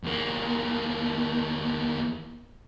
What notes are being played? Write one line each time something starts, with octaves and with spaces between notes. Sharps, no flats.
E2 A#3